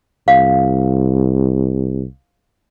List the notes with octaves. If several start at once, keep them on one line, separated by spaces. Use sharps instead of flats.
C2 F5